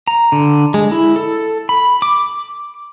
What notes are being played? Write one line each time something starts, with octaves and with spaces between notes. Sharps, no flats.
A#5
D3
G#3
E4
A4
B5
D6